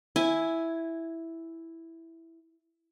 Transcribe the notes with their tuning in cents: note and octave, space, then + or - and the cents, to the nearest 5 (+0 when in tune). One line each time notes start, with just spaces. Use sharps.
E4 +0 G#5 +0